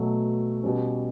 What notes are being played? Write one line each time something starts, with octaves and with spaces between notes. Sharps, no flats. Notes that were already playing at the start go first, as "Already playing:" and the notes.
Already playing: B2 F#3 A3
B2 G3 C#4